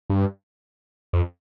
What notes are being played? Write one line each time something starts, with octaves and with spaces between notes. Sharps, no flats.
G2
F2